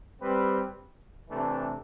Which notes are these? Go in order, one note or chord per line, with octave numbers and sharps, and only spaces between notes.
G3 C4 G4 B4
C3 E3 A3 D4